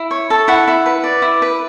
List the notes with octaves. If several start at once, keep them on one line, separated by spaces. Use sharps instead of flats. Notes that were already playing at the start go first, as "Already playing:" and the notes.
Already playing: E4
C#5
A4
E4 F#5
E4
B4
D5
E4
B4